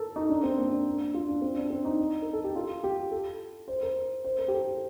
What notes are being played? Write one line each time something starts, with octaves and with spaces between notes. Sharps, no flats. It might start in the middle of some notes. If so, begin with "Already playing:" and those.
Already playing: A4 A#4
D#4
D4
C4
A#3
D4
F4
D4
C4
D4
C4
D#4
A#4
A4
G4
F4
G4
A4
C5
A#4
C5
A#4
G4
A4